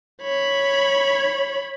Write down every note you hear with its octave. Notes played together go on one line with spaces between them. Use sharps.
C#5 B5